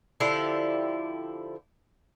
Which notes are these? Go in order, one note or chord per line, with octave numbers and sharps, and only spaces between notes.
D3 F3 E4 G4